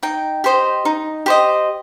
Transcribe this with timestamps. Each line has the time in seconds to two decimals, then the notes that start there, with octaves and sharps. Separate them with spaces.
0.03 D#4 G5
0.44 G4 C5 D#5
0.85 D#4
1.26 G4 C5 D#5